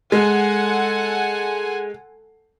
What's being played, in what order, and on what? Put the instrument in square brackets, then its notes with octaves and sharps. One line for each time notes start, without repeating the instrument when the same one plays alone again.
[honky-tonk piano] G#3 [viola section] A4 F#5 G#5